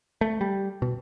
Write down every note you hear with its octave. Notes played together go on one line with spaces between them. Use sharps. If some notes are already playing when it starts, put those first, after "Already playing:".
A3
G3
B2